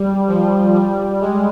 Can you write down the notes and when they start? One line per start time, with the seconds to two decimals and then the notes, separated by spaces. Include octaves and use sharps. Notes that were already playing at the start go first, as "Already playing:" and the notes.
Already playing: G3
0.28 F3
0.74 G3
1.21 G#3